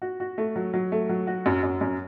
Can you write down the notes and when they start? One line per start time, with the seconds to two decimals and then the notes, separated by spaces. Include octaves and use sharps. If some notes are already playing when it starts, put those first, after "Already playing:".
0.02 F#4
0.20 F#4
0.38 A3
0.56 F#3
0.74 F#3
0.92 A3
1.09 F#3
1.27 F#4
1.46 F#2
1.63 F#2
1.81 F#2